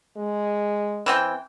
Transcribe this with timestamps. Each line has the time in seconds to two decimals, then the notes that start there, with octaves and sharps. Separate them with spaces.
0.17 G#3
1.06 E3 C4 G5